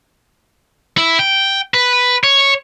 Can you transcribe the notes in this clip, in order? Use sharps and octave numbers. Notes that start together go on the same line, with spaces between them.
E4
G5
B4
C#5